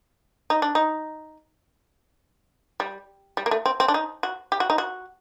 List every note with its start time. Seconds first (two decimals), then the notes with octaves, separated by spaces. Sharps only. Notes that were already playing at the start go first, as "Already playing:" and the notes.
0.50 D#4
0.62 D4
0.75 D#4
2.80 G3
3.37 G3
3.46 A#3
3.51 A3
3.66 C4
3.80 C4
3.88 D4
3.94 D#4
4.23 F#4
4.52 G4
4.60 F#4
4.70 D#4
4.78 F#4